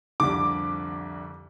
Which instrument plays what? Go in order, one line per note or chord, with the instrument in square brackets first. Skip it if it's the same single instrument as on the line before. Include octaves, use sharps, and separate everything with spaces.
[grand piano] C2 F2 D3 [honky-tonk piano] D6